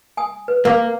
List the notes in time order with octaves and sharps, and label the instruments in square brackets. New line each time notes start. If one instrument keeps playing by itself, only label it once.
[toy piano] G#5 D#6
B4
[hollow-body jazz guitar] A#3 [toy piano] A#4 F5 D6